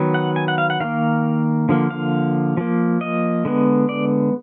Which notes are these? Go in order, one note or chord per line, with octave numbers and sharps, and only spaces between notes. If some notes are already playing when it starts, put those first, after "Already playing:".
Already playing: D#3 F#3 B3
F#5
G#5
F#5
F5
F#5
D#3 A#3 F5
D3 F3 A#3
F5
F3 A#3
D#5
D3 G#3 B3
D5